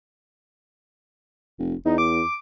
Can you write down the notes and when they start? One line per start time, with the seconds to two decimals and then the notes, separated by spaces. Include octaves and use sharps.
1.59 F1
1.85 E2 D#4
1.98 D6